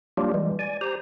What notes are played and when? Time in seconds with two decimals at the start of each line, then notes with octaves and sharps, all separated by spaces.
0.17 F#3 G3 A#3 D4 F4 G4
0.34 E3 G3 G#3
0.59 D5 G#5
0.81 G4 C5 A#5